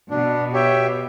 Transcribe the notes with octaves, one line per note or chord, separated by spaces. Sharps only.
B2 D4
G4 C#5 E5 G5